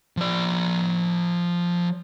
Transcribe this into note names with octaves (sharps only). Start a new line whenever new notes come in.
F3 D5